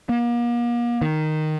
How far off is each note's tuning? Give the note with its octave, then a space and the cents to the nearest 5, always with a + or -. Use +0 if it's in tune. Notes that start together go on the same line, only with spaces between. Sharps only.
A#3 +40
D#3 -5